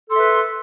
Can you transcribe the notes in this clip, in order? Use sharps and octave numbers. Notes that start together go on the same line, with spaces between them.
A4 B4 E5 C6